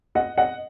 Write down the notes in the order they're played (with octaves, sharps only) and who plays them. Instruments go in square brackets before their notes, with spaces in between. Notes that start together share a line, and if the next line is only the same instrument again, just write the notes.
[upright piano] D#5 F#5
D#5 F#5